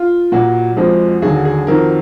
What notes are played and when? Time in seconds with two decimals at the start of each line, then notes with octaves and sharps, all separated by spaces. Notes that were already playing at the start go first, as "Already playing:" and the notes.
Already playing: F4
0.32 A#2 F#3 F#4
0.77 F2 F3 G#3
1.22 D#2 D3 F#3 G#4
1.45 G#4
1.67 F2 D#3 F#3 A#4